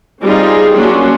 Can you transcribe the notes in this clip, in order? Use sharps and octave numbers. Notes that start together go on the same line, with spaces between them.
G3 C4 D#4 F4 G#4
F#3 A#3 C#4 D4 F4 F#4